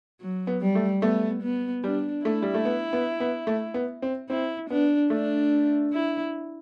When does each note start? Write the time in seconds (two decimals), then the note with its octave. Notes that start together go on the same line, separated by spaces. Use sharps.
0.21 F#3
0.47 B3
0.61 G3
0.75 A3
1.02 A3 B3
1.43 B3
1.84 G3 D4
2.25 A3 E4
2.42 G3
2.54 A3
2.65 B3
2.93 B3
3.20 B3
3.47 A3
3.74 B3
4.02 C4
4.29 C4 E4
4.70 B3 D4
5.10 A3 D4
5.93 E4